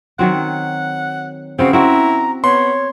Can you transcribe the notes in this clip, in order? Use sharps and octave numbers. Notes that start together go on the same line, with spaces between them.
D#3 F#3 C4 F#5
C#3 B3 C4 F#4 C5
C4 E4 F#4 A#5
B3 C#5 C6